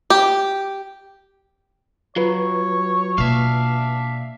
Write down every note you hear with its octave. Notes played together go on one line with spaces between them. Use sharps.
G4
F#3 F4 B4 C#5
B2 A#3 D4 E5 F5